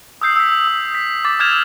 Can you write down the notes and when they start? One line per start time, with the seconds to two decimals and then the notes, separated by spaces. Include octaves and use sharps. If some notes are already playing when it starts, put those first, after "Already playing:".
0.21 D#6 E6 G6 C7
0.36 E6 B6
0.67 D#6
0.95 B6
1.25 D6 A6
1.40 E6 F6 G6 G#6 E7 F7